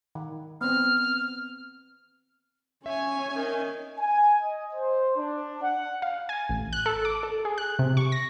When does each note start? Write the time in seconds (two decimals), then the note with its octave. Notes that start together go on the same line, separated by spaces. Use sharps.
0.15 D#3
0.61 B3 C4 F6
2.86 C#4 C#5 E5 G#5
3.35 D#3
3.99 G#5
4.42 D#5
4.75 C5
5.16 D4
5.63 F#5
6.02 F5
6.29 G#5
6.49 A1
6.73 F#6
6.86 A4
7.05 D6
7.23 A4
7.45 G#4
7.58 F#6
7.79 C3
7.97 C#6
8.12 A#6